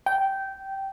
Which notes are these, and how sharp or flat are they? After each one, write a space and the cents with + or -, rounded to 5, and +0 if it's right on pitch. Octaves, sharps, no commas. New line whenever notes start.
G5 -15